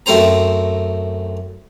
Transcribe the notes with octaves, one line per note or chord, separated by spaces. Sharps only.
F#2 A3 C4 C5 A#5